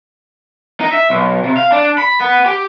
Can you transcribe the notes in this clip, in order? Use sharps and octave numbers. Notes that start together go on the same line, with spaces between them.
D#4
E5
B1
C3
F5
D4
B5
B3
G4